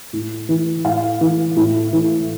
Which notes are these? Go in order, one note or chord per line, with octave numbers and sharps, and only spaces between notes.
A2
E3
A2 F5
E3
A2
E3